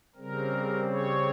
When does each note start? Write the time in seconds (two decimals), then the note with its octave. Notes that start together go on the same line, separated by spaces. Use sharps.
0.15 C#3 G3 C4 A#4
0.89 C#5